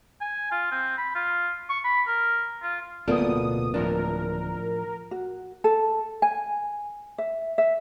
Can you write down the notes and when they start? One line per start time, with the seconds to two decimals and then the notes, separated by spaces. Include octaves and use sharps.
0.21 G#5
0.51 F4
0.72 C4
0.97 B5
1.15 F4
1.70 C#6
1.84 B5
2.07 A#4
2.62 F4
3.08 D1 B2 A#3 B3 F4 A4 D5 D#6
3.74 A2 F3 D4 A#4
5.11 F#4
5.64 A4
6.22 G#5
7.18 E5
7.58 E5